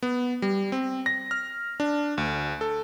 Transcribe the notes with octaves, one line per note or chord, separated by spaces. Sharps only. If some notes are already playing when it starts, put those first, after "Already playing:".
B3
G3
C4
A#6
F6
D4
D2
A4